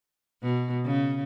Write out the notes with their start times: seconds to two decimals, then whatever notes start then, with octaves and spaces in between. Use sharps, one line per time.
0.43 B2
0.85 C#3